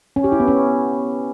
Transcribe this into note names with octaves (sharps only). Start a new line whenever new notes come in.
C#4
G4
E4
B3
C#4